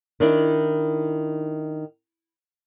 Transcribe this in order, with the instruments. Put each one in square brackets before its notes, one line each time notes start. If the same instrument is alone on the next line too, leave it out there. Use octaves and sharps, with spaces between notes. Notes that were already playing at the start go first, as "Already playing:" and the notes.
[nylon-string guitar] D#3 D4 E4